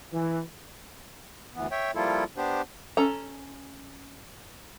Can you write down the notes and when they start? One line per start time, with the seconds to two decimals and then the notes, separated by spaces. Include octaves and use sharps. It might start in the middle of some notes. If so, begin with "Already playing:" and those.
0.13 E3
1.55 D2 E3 B3
1.71 C#5 E5 G5
1.95 F3 G3 A#3 E4 F4 A4
2.37 B3 D4 G4 C5
2.97 C#4 A4 A#5